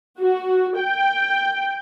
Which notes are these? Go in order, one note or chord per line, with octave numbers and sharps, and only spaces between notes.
F#4
G5